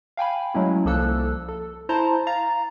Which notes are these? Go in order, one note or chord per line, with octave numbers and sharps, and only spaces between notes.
F5 G5 G#5 B5
F#3 G#3 A3 C#4 E4
C2 F3 A#3 A4 E6 F#6
A4
E4 C5 A5 A#5 C6
F5 A#5 A6